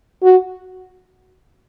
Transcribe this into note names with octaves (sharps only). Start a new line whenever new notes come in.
F#4